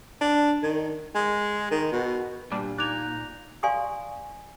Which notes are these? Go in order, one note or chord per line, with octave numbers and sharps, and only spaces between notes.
D4
D#3
G#3
D#3
B2
A#2 G3 D4
D#4 D5 F#6 G#6 F7
D5 F5 G#5 C6 C#6 D#6